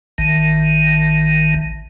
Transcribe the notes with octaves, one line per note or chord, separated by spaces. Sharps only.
A1 D#3